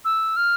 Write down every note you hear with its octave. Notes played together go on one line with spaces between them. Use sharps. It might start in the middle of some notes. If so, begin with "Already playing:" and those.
E6
F6